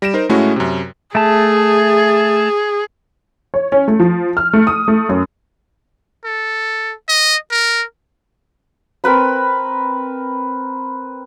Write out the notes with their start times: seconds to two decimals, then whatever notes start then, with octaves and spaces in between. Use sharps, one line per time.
0.02 G3 A#6 D7 E7
0.14 D#4 A#4 C5
0.29 A2 G#3 A3 C#4 E4 F#4
0.56 F#2 C3
1.15 A3 G#4 A5
3.54 C#5
3.72 C#4
3.88 A3
4.00 F3
4.37 F6
4.53 A3
4.67 D#6
4.88 A3
5.09 F#2
6.25 A4
7.08 D#5
7.51 A#4
9.04 C4 A#4 B4 B5